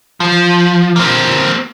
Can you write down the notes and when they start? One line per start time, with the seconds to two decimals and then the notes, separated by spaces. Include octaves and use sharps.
0.20 F3
0.96 A#3 C4